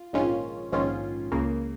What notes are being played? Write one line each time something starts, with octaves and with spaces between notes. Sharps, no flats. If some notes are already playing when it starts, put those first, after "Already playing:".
Already playing: F4
A#1 G#2 D#3 C#4 F4
A#1 G#2 D#3 C#4 F4
C#2 C#3 A#3